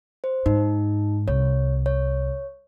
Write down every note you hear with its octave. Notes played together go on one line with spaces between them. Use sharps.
C5
G#2 D#4
C2 C#5
C#5